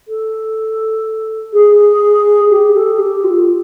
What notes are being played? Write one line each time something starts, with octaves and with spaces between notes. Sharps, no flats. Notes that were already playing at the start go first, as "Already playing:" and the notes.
A4
G#4
G4
A4
G4
F4